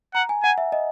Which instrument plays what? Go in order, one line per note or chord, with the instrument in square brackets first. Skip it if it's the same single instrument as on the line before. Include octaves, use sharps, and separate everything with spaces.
[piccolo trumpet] F#5 [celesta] A#5
[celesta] G#5
[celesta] F#5 [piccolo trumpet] G#5
[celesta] E5
D#5